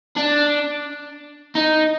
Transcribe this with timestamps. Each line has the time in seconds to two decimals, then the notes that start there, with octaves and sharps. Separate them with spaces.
0.16 D4
1.55 D#4